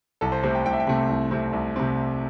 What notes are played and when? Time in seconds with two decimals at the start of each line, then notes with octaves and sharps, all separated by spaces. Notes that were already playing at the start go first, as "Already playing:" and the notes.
0.21 C2 A4
0.32 C5
0.43 C3 A3 C4 C5
0.55 G5
0.65 C2 G5
0.73 E5
0.80 G5
0.87 C3 A3 C4
1.09 C2
1.31 C3 A3 C4
1.53 C2
1.76 C3 A3 C4